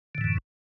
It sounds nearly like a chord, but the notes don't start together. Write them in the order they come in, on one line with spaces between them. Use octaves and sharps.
D3 A2 E3 F#2